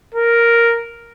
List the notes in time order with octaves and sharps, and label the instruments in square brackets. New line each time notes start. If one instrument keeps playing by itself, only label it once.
[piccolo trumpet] A#4